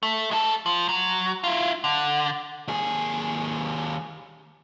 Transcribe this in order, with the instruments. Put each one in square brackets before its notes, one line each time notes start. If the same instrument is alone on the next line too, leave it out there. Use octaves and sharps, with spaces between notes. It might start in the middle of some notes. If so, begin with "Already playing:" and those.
[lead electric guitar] A3
G#3 A4
F3
F#3
E4 F4
D3
D#2 G#4